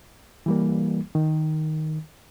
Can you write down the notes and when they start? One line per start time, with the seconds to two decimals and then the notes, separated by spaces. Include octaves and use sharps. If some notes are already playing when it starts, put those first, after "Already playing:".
0.46 E3 G3 A#3
1.15 D#3